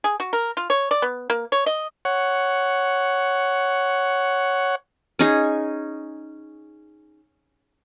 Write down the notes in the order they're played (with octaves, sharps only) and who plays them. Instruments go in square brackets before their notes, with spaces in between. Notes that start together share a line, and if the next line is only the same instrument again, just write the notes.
[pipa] G#4
F#4
A#4
F4
C#5
D5
B3
A#3
C#5
D#5
[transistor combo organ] C#5 F#5
[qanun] C#4 D#4 G#4